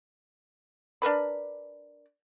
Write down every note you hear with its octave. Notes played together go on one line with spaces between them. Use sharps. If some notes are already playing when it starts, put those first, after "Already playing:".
D4 A#4 B4 B5